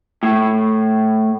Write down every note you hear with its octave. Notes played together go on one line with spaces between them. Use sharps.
A2